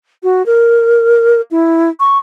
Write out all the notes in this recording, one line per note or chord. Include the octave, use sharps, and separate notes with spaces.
F#4
A#4
E4
C#6